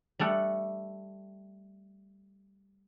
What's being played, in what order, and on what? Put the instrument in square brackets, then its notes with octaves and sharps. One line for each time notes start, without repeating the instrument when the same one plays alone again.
[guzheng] G3 A3 A4 F#5